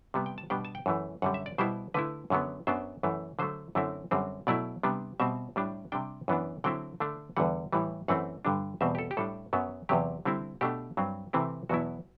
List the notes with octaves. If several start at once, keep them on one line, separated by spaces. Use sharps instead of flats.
C3 G3 B3
G5
A5
B2 G3 B3 D4 G5
A5
G5
F#2 E3 A3
F#2 D3 G3 F#5
E5
D5
B2 G3 B3 E4 C5
D3 A3 E4 B4
F#2 D3 F#3 B3
F#2 F#3 B3 D4 C5
F#2 E3 A3
D3 F#3 A3 C5
F#2 D3 A3 C4 E4
F#2 D3 G3 C4
B2 F#3 A3 E4 D5
C3 G3 B3 D4
B2 G3 C4 E5
A2 G3 D4
C3 G3 D4 G5
F#2 E3 B3 D4
D3 F#3 C4 E4 G5
D3 A3 D4
E2 D3 G3 F#5
A2 E3 G3
F#2 E3 A3 C4 F#5
G2 D3 G3 D4
E2 B2 G3 C4 E5
G4
A4
G4
A2 G3 D4 A4
F#2 F#3 B3
E2 C3 F#3 G4
D3 G3 C4 E4
B2 A3 D4 G4
G2 F#3 C4
C3 E3 A3 C4 E4
E2 B2 F#3 B3 E4 F#4